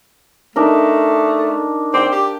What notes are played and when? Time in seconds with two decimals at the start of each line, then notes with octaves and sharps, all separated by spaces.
0.56 A3 D4 D#4 A#4
1.94 C4 D5 G5
2.12 G4